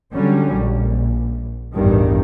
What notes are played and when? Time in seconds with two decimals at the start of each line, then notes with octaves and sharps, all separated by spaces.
0.13 D3 F#3 G3 C#4
0.57 A#1
1.75 A1 E2 G2 D#3